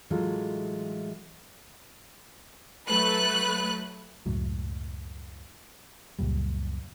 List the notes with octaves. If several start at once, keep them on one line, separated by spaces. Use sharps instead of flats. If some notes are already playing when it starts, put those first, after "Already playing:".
A2 E3 F#3 G#3 F4 A4
F#3 A3 B4 F#6
C#2 F#2 A2 F#3
C#2 F#2 A#2 G3